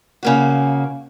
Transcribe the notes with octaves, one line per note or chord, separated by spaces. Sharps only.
C#3 A#3 F#4